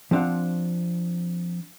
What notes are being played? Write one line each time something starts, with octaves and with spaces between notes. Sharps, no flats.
F3 C4 D4 F5 F#5